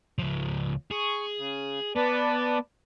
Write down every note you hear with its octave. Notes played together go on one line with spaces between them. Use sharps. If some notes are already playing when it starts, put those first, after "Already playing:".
C#2 F3
G#4 C#6
C#3
B3 B4 D5 A5